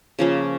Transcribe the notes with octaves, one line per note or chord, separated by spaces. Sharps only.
C#3 F3 A#3 C#4